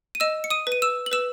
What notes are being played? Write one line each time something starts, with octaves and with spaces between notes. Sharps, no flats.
D#7
D#5 E6 E7
C#7
D#6 D#7
B4
D#7
E6 E7
F#7
B4 E6 E7